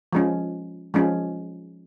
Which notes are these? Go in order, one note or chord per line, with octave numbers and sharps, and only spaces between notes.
F3 G#3 C#4
F3 G#3 C#4